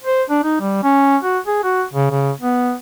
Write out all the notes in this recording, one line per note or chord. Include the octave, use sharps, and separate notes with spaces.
C5
D4
D#4
G3
C#4
F#4
G#4
F#4
C#3
C#3
B3